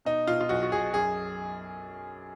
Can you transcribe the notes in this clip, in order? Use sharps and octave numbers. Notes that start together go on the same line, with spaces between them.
B2 D#4
B2 F4
F4
B1 F#4
F#4
B1 G#4
F#2 G#4